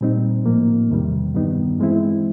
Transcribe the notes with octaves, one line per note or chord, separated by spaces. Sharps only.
A#2 G3 C4 D#4
A2 F3 A#3
E2 C3 D#3 G3
G2 D#3 G3 B3 D#4
E3 G#3 C4 E4